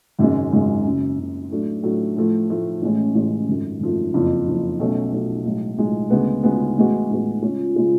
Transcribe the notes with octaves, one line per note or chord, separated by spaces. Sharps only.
G#1 F#2 C#3 G#3
G#1 F#2 C#3 G#3
F#1 F#2 C#3
F#1 F#2 C#3
A2 F#3 A3 D4
A2 F#3 A3 D4
A2 F3 A3
A2 F3 A3
A1 A2 G#3 C#4
A1 A2 G#3 C#4
G#1 F#2 F3 A3
G#1 F#2 F3 A3
F#1 F2 F3
F#1 F2 F3
B1 B2 A3 C#4
B1 B2 A3 C#4
B1 A2 G#3
B1 A2 G#3
D2 C#3 G#3 B3
D2 C#3 G#3 B3
A1 A2 G#3 B3 F#4
A1 A2 G#3 B3 F#4
C#3 G#3 C#4 F4
C#3 G#3 C#4 F4